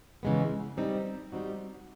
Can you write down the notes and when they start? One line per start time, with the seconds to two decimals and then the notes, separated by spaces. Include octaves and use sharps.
0.23 C#3 E3 G#3 B3
0.77 G3 C4 D#4
1.32 G3 C4 D#4 F#4